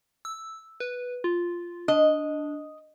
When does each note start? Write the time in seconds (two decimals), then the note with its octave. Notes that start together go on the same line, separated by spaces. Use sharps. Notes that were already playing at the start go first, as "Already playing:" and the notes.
0.25 E6
0.80 B4
1.24 F4
1.88 D4 D#5